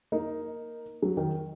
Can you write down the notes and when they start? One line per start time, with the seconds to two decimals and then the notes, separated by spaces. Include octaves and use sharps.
0.12 A#3 D#4
1.02 F#3
1.17 D#3